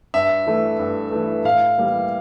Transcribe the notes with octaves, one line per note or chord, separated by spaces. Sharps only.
G2 E5
E3 A3
G2
E3 A3
A2 F5
E3 G3 A#3